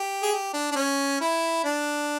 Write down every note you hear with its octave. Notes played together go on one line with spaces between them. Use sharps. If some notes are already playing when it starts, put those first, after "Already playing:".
Already playing: G4
G#4
G4
D4
D4
C#4
E4
D4